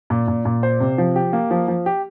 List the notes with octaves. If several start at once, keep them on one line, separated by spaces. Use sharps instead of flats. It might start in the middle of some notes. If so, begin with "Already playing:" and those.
A#2
A#2
A#2
C5
C3
F3
G4
A#3
F3
F3
G4